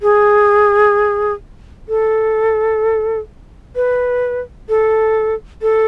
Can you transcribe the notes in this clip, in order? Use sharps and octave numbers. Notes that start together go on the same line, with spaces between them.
G#4
A4
B4
A4
A4